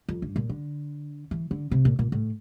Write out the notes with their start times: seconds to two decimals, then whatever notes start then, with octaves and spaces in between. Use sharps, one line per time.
0.09 F2
0.22 G2
0.36 A#2
0.49 D3
1.31 E3
1.51 D3
1.71 C3
1.85 A#2
1.99 A#2
2.12 A2